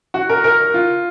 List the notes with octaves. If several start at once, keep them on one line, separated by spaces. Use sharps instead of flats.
F#4
A#4
A#4
F4